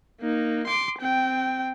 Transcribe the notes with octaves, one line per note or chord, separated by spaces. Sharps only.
A#3 D#4
C6 D6
C4 G5